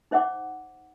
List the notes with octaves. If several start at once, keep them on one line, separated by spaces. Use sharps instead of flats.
D#4 C5 E5 F#5 D6